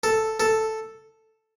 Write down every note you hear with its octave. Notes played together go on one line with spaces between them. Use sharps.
A4
A4